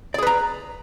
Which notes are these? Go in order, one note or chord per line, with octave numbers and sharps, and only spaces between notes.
G#4 B4 D5 A#5